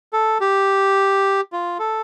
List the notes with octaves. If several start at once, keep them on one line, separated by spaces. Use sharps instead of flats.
A4
G4
F4
A4